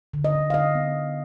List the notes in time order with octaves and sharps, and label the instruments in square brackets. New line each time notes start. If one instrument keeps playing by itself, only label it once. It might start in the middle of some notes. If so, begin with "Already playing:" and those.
[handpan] D3
D#5
D3
F5
D3 D#5
B3